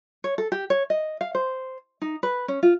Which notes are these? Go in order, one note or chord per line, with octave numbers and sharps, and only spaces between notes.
C#5
A4
G4
C#5
D#5
F5
C5
D#4
B4
C#4
F4